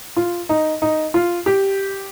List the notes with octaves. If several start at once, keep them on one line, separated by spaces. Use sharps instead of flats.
F4
D#4
D#4
F4
G4